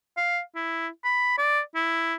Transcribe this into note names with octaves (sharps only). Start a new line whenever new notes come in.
F5
E4
B5
D5
E4